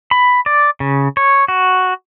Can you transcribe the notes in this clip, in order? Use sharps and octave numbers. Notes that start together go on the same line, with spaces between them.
B5
D5
C#3
C#5
F#4